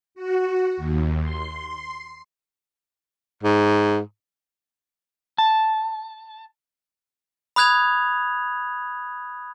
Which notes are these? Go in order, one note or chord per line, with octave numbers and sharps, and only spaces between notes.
F#4
D#2
C6
G#2
A5
B5 D#6 F#6 G#6 F7